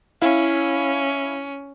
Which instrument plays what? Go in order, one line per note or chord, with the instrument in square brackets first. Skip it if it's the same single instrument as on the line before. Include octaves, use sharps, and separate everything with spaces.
[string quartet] C#4 [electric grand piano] E4 F5